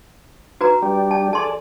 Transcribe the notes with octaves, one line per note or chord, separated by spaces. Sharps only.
F#4 B4 A#5
G3 D4 G4
A5
G#4 A4 D5 A5 C6